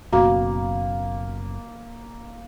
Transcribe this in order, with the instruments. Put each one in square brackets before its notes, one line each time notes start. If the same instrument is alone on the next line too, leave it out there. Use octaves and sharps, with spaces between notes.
[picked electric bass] F#1 F#2 B2 [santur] A#3 [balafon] F#4